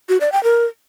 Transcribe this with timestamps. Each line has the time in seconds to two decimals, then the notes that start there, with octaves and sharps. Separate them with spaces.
0.09 F#4
0.21 D5
0.32 G5
0.44 A#4